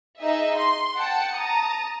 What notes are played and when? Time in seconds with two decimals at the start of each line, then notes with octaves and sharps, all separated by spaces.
0.19 D#4 G#4 D#5 E5
0.58 C6
0.96 F#5 G5 A5 C#7
1.35 A5 A#5 D#6